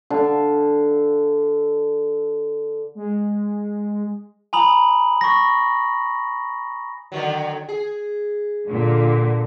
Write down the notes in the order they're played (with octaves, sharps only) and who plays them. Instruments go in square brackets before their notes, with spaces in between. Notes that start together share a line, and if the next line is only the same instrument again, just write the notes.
[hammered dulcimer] D3 F5 A5
[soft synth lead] G#3
[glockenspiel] G#5 A#5 B5 D#6 F#7
C#6 A#6
[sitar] D3 D#3 F#3
G#4
[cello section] A#2 D3